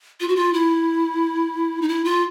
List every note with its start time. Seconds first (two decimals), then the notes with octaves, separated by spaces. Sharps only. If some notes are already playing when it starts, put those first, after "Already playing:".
0.20 F4
0.28 F#4
0.36 F4
0.53 E4
1.82 D#4
1.88 E4
2.04 F4